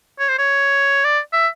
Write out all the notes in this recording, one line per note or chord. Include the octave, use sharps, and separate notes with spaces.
C#5
C5
C#5
D5
E5